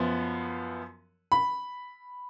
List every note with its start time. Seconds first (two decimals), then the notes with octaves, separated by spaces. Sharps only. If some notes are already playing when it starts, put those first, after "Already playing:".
Already playing: F#2 F3 B3
1.32 B5